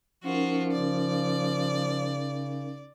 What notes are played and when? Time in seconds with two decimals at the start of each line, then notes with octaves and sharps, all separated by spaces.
0.24 F3 C#4 D#4 F4 F#4 A#4
0.72 C#3 D5